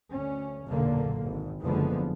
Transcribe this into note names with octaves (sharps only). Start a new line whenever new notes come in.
D2 C#4
F#1 B1 E2 A#2 D3 A#3
G#1 G#2
F#1 E2 D3 F3 G#3 B3